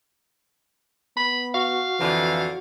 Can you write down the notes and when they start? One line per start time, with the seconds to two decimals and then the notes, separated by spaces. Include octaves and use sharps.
1.17 B3 B5
1.54 F#4 F5
2.00 F2 D3 E3